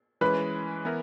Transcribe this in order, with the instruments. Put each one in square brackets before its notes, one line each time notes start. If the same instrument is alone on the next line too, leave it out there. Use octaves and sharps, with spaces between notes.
[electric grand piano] E3 G#3 C#4 [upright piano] B4
[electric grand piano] E3 B3 E4 A#4